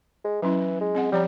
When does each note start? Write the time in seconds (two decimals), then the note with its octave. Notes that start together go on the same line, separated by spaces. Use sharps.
0.25 G#3
0.42 E3 F#3 C#4 E4
0.81 G#3
0.95 C4 D#5 F#5
1.12 F3 G3 C#5 A#5